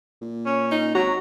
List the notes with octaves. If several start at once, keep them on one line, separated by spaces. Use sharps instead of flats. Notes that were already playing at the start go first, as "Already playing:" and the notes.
A#2
C#4
D#4
G#1 F#3 F#4 A#5